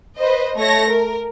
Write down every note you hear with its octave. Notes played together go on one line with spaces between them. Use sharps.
B4 C5 D#5
A3 C#5 A#6
A#4